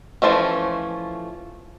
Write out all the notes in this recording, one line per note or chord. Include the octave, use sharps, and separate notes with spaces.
E3 F3 A3 C#4